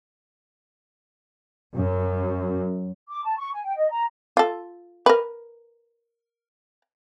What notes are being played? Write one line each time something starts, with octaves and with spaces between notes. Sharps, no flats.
F#2
D6
A5
C#6
G#5
G5
D#5
A#5
F4 A4
A#4 B4